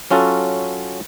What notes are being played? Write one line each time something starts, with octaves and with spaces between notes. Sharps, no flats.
F#3 C#4 F4 F#4 A4